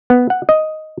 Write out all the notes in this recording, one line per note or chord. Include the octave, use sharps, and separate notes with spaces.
B3
F#5
D#5